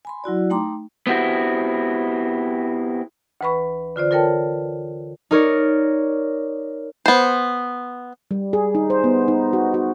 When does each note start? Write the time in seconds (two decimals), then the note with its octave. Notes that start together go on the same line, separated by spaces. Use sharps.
0.05 G#5 B5 C6
0.24 F#3 E4 F#4 D5
0.50 A3 D#4 G5 A#5 C6 D6
1.07 B3 C4 E4 F#4 G4
3.41 D2 E3 B4 B5 C#6
3.96 D3 F4 C5 D5
4.11 F4 A4 A#4 C#5 G5 A5
5.31 D#4 A#4 C#5 D5
7.06 B3 C5
8.31 G3
8.53 G#4
8.75 D#4
8.90 C5
9.04 B3
9.28 D#4
9.53 F#4
9.74 F#4